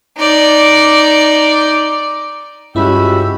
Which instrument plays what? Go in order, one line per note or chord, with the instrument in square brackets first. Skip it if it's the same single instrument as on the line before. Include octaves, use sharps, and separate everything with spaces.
[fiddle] D#4 D5
[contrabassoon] C#2 [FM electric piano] G2 E4 [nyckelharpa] F#4 G4 [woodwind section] B5 E6